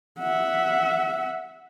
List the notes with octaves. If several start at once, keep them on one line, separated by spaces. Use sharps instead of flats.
E5 F#5